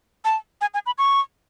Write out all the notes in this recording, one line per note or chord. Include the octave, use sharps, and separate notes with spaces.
A5
G#5
G#5
B5
C#6